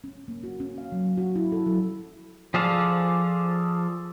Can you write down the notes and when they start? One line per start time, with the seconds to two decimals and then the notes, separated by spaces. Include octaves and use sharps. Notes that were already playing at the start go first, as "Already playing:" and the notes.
0.04 C#4
0.28 A#3
0.43 F#4
0.60 C#4
0.78 F5
0.92 F#3
1.17 F#4
1.36 E4
1.52 A4
1.66 F#3
2.54 F3 G#4 A4 D5 F5